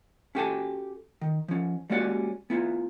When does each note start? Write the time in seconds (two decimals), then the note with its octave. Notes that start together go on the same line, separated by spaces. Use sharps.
0.35 C#4 F#4 G4 A4 G#5 A5
1.21 D#3
1.48 F3 C#4
1.90 G3 G#3 A#3 C#4 F#4 D5
2.50 B3 E4 F4